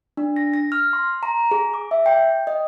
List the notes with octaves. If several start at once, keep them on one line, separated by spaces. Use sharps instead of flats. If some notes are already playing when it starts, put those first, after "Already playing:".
D4
A#6
A#6
F6
C6
A#5
G#4
D6
E5
G5
D#5